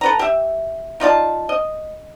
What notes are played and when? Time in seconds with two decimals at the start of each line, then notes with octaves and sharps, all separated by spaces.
0.01 A4 B4 A#5
0.19 G4 E5
1.00 D#4 F4 D5 A5
1.49 D#5